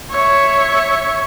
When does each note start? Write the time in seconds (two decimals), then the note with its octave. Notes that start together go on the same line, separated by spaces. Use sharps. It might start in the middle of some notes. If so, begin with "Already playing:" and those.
0.11 C#5 E5